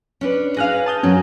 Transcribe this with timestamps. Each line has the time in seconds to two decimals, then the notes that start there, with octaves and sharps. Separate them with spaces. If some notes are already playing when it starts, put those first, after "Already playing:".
0.21 C#4 D4 B4
0.57 G#4 B4 F5 F6 F#6 A#6
0.86 A5 D#6 G6
1.03 F#2 F#3 C#4